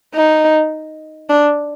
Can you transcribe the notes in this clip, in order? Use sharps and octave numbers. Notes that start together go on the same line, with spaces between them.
D#4
D4